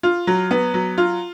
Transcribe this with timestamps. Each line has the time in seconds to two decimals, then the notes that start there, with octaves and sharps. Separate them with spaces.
0.03 F4
0.27 F#3
0.51 B3
0.74 F#3
0.98 F4